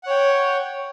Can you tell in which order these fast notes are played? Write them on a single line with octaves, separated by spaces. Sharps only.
F#5 C#5 G5